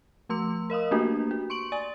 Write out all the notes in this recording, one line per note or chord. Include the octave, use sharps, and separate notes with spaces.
F3 A3 C6 E6
A#4 D#5 F5 D#6
A3 A#3 D4 F#4 G4
F#4
C6 C#6 D7 F#7
D5 G#5 A6